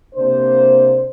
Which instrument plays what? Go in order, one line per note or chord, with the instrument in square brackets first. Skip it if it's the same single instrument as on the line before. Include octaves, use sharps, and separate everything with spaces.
[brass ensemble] C3 A#3 D4 C5